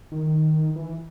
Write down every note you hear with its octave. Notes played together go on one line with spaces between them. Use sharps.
D#3
E3